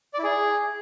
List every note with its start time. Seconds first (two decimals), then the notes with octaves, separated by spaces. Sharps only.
0.13 D5
0.19 E4
0.24 G#4